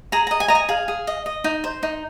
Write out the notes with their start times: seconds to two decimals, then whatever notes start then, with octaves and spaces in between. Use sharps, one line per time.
0.12 G#4 A#5
0.27 A#5
0.31 D#5
0.40 G#5
0.48 D#5 A#5
0.55 G#5
0.69 G#4 F5
0.88 G#4
1.07 D#5
1.26 D#5
1.44 D#4
1.64 C5
1.83 D#4